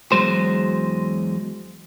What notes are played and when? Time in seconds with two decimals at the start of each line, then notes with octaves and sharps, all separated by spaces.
0.12 E2 A#2 F#3 G#3 C5